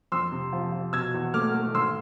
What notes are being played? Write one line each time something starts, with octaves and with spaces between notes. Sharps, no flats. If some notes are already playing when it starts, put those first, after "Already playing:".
F2 C6 E6
C3
F3
F3
B2 E6 G#6
E2
A3 D6 F6
A3
G#1 C6 E6